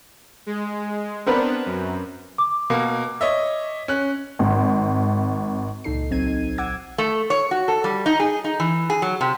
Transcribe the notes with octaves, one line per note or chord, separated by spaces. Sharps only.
G#3
B3 C4 D4 A#4 B4
F#2
D6
B2 A#3
C#5 D#5 E5
C#4 F#6
G#1
C#2 A#2 D#4 A4 C7
A#1 F#3 C4 D#4 G#6 D#7
F#5 D6 E6 G#6
A3
C#5
F#4
A4
G3
D#4
G#4
D#4
E3
G#4
F#3
C3